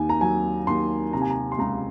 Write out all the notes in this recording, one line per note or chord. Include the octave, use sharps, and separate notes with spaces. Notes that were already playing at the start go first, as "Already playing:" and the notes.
Already playing: D#2 D#3 G#5
A#5
F#3 G#5
D#2 C6
C3 A#5
G#5
A#5
C6
C#2 A#5